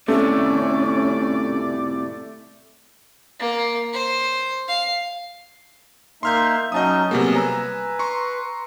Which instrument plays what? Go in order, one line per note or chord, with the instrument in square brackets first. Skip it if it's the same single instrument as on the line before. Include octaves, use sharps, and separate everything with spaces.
[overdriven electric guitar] A2 C3 [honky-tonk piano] A3 [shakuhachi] C#4 [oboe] D5
[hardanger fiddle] A#3
C5
F5
[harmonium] A#3 D#4 E5 [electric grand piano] C6 F6 G6
[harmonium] F#3 C#4 D#4 [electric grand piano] D#5 A5 D#6
[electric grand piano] C3 G3 A#3 [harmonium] F#3 B3 G#4
[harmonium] B4 [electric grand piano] G#5 A#5 E6
[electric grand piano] A#5 C6 C#6